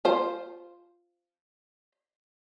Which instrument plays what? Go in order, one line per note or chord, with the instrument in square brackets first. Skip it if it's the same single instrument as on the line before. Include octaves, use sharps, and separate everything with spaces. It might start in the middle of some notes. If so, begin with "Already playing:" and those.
[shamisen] F4 C5